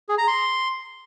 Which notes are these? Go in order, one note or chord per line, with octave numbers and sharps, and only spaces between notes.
G#4
A#5
C6